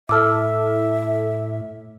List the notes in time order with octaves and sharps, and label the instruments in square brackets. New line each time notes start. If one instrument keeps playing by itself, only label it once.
[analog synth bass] A2 [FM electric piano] E4 A4 [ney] E5 [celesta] D6 E6 F6